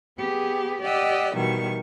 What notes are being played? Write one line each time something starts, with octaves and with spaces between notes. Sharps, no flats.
B3 G4 G#4
G4 D5 D#5 F#5 E6
B2 D#3 E3 G3 C#6